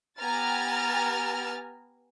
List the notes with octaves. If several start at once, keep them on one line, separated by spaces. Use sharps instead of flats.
B3 G4 G#5 A#5 F6 A6